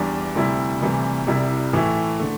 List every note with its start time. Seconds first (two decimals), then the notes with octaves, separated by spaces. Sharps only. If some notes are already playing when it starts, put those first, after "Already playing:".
Already playing: E2 E3 G3 D4
0.35 D2 C3 G3 E4
0.81 D2 C3 E3 G3
1.27 C2 C3 G3 E4
1.73 A2 E3 A3 E4
2.20 D3 A3